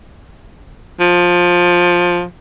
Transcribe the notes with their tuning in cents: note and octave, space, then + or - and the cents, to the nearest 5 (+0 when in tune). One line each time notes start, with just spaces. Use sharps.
F3 +15